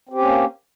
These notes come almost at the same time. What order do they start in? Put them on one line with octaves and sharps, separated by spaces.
C4 G4 C#4 A#3